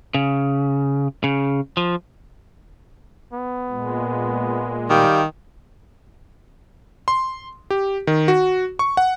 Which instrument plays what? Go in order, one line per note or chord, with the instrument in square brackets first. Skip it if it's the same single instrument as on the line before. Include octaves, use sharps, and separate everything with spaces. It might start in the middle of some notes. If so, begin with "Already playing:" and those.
[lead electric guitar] C#3
C#3
F3
[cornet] B3
[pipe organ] A#2 G#3
[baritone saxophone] D#3 [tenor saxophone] G3 [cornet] F5
[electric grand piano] C6
G4
D#3
F#4
C#6
F#5